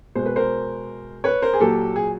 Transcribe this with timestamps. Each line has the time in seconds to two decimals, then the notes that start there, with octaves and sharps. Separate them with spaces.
0.15 B2 G#3 C5
0.26 B4
0.36 A#4 C5
1.24 B4 C#5
1.42 A#4 C5
1.53 G#4
1.60 A#2 F#3 G4 A4
1.96 G#4